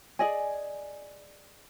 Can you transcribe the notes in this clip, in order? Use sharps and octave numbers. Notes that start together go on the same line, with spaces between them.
G#4 D5 D#5 G#5